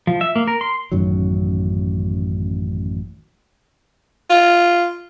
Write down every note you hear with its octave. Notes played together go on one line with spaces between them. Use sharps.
F3
E5
A#3
A#4
C6
A1 F#2 D#3 F#3
F4